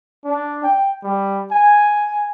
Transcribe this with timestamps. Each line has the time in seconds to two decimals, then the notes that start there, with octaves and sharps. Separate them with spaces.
0.25 D4
0.64 G5
1.03 G3
1.52 G#5